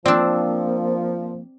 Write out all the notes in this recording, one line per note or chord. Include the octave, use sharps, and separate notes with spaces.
F3 A#3 C4 D4 D5 E6